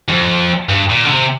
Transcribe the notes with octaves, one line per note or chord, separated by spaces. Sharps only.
F2
G2
A#2
D3
C3